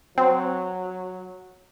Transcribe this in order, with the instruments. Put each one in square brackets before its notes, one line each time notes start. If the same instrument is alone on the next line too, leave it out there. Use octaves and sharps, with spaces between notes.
[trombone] F#3 [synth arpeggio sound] C4